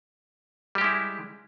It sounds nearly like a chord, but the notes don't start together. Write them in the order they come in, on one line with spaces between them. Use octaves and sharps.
G3 G4 G#3 E4